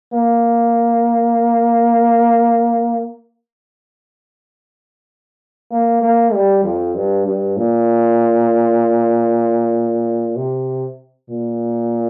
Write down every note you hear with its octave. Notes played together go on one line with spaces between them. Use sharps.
A#3
A#3
A#3
G3
F2
G2
G2
A#2
C3
A#2